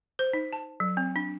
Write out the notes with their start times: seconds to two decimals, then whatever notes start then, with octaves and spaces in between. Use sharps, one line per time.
0.19 C5
0.33 D#4
0.53 A5
0.80 F#3
0.97 C4
1.16 D4